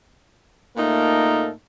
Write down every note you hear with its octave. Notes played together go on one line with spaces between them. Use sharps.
A#2 A3 A#3 D#4 A4 A#4